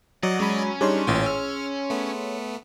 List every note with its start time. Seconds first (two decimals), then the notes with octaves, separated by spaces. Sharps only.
0.23 F#3 D5 D#5 F#5
0.40 G#3 C#4 B5
0.81 G3 D4 D#4 G#4 C#5 C6
1.07 A1 A#2 G5 G#5 A6
1.26 E6 F6
1.90 A3 B3